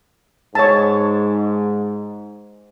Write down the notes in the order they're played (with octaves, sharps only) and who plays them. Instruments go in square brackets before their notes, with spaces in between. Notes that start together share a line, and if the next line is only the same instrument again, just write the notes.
[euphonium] G#2 [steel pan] C#5 A5